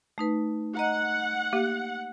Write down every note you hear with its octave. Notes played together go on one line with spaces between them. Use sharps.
A3 D#4 B4
D#5 F#5 A#5
A#3 G4